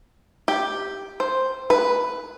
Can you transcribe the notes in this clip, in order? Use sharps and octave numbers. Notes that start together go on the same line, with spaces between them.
G4
C5
B4